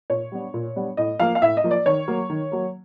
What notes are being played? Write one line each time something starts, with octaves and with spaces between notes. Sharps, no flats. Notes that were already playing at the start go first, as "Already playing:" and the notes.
A#2 C#5
G3 B3 D4
A#2
G3 B3 D4
A2 D#5
F3 A#3 F5
F5
A2 E5
D#5
F3 A#3
D5
D#3 C#5
F#3 A#3
D#3
F#3 A#3